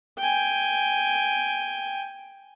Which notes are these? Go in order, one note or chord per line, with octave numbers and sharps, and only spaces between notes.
G5 G#5